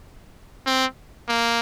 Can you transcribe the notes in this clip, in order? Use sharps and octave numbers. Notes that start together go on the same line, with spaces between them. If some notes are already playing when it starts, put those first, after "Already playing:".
C4
A#3